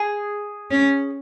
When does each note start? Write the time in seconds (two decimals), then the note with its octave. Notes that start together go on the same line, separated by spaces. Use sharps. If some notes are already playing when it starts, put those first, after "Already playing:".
Already playing: G#4
0.71 C#4